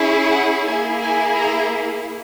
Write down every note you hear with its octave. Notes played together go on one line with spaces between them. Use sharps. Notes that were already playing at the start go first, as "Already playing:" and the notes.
Already playing: C#4 E4 G#4
F#5
A#3 E4 G#4 G#5
G#5
A#5